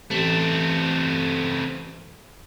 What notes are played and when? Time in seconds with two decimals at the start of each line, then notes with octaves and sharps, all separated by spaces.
0.10 A1 A3 C4